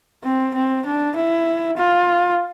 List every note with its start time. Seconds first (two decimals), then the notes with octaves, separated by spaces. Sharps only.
0.24 C4
0.55 C4
0.86 D4
1.16 E4
1.77 F4